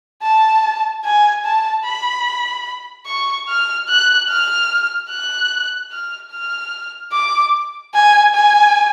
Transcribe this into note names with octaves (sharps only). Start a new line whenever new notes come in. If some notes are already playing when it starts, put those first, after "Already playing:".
A5
G#5
A5
B5
C#6
F6
F#6
F6
F#6
F6
F6
D6
G#5
G#5